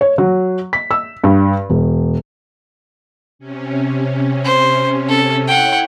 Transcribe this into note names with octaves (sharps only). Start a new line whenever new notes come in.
C#5
F#3
B6
E6
G2
E1
C3 C#4
C5
A4
E4 C#5 F#5 G5